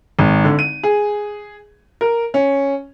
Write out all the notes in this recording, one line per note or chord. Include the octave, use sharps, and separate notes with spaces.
G#1
D3
D#7
G#4
A#4
C#4